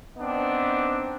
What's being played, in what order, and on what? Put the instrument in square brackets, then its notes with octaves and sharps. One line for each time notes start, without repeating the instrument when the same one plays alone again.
[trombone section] B3 C4 D4 D#4